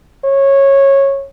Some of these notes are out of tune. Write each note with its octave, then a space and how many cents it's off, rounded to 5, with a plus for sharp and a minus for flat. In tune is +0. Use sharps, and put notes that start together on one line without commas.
C#5 -15